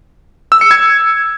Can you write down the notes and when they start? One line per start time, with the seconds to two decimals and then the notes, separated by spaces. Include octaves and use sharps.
0.52 E6
0.61 C#7
0.71 G#6